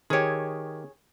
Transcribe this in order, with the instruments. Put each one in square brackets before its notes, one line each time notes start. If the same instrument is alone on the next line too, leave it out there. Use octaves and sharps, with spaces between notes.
[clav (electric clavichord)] D#3 G4 [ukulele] G#4 C#5